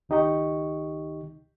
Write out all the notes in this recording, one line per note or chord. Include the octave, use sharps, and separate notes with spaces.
C#2 D#3 D#4 G4 D#5 C#6